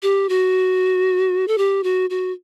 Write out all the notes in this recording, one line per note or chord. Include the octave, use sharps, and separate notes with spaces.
G4
F#4
A4
G4
F#4
F#4